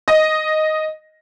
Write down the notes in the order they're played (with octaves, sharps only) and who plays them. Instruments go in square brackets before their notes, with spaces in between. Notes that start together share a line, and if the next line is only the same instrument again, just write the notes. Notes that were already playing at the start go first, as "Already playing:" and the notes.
[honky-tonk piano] D#5